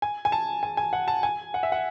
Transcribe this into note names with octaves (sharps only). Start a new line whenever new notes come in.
G#5
G#5
A5
G#5
G#5
F#5
A5
G#5
F#5
E5
F#5